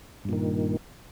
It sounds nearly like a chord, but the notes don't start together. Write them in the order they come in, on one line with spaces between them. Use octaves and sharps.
G2 A#2 D#3